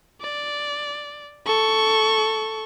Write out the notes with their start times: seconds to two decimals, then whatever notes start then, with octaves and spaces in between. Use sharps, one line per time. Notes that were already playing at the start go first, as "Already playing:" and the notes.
0.21 D5
1.46 A4 C#6